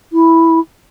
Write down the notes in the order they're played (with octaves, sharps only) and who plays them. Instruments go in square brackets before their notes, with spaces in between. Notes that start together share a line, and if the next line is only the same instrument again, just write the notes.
[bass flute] E4